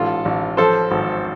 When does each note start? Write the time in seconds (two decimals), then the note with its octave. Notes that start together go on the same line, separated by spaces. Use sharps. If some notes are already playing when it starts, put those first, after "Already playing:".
Already playing: A1 G#2 F4 A4
0.25 A1
0.57 F3 A4 C5
0.91 G#1